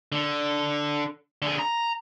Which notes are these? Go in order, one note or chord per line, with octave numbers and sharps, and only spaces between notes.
D3
D3 G#4
A#5